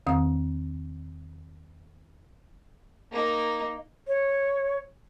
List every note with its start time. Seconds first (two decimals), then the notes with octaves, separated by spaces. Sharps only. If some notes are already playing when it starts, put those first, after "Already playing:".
0.07 E2 D#3 C4 D#6
3.12 A#3 D#4
4.07 C#5